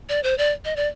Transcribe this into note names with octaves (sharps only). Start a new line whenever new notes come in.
D5
C5
D5
D#5
D5